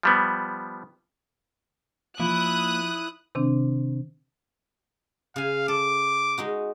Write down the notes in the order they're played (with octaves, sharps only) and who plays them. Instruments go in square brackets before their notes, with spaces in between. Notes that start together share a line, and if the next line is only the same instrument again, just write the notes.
[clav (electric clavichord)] F3 G3 B3
[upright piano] F3 [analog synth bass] A#3 [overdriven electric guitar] E4 [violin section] D#6 F#6
[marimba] C3 D#3 C4 D4
[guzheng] C#3 G#5 [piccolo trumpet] F5
[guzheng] A4 [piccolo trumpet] D6
[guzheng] G#3 D#4 F#4